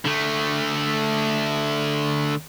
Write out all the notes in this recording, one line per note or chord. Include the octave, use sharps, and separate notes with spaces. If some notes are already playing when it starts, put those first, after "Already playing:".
D3 A3